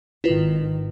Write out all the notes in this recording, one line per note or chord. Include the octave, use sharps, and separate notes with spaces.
G#1 D#3 E4 F4 B4